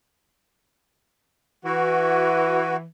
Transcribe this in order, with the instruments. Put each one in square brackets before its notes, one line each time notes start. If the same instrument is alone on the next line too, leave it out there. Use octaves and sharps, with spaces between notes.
[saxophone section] E3 [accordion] F#4